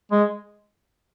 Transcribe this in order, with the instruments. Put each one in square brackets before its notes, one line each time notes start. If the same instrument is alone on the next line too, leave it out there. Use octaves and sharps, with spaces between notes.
[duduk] G#3